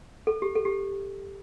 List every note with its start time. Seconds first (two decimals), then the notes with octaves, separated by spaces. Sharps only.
0.27 A4
0.42 G4
0.55 A4
0.65 G4